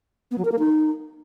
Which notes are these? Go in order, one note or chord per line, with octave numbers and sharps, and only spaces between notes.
B3
F#3
A#4
A#3
D#4